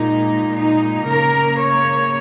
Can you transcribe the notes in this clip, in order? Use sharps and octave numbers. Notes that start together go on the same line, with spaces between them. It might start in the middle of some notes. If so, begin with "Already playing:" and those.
Already playing: A#2 G#3 D#4
D#4
C#3 A#3 A#4
C#5